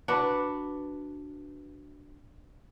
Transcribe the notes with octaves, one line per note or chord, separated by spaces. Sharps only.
D4 F#4 B4